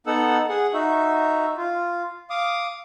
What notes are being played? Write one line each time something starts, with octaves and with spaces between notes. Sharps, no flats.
B3 D#4 A4 F#5 E6
G#4 F#5
D#4 F#4 E5
F4
F5 D6 D#6